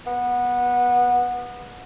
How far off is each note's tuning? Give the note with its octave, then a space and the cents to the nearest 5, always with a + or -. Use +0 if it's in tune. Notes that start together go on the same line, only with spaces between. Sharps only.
B3 -15